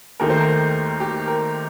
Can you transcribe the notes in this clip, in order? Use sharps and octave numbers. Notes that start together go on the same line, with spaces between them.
D#2 D#3 A3 A#4
C5
A#4
G4
A#4